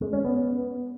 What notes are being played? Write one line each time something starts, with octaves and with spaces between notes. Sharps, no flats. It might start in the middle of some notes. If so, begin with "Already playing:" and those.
G#3
C#4
B3